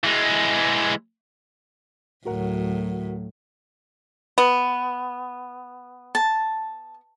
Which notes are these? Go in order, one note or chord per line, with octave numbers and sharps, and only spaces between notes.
E3 G#3
D2 A2 F#3 F#4 A#4 F#5
B3
A5